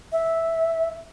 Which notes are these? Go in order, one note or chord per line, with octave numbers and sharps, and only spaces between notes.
E5